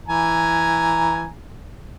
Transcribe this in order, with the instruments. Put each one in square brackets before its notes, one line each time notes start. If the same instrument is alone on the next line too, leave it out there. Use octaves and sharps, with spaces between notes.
[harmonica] E3 G#5 A#5